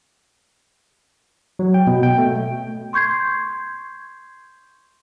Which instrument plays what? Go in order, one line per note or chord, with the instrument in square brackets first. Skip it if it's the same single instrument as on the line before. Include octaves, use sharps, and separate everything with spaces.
[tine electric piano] F#3
G5
B2
G5
A3
[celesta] C6 C#6 G6 G#6 C7